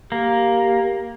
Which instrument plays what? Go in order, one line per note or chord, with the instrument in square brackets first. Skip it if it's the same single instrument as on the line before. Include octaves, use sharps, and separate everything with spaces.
[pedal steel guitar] A#3 [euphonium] G4